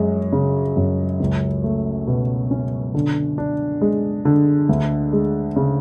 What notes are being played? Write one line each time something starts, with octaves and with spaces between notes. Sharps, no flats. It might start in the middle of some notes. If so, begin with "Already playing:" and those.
Already playing: F#2 G#3
C#3
F#2
C#2
A3
B2
C#4
D3
D4
G#3
D3
D2
G#3
C#3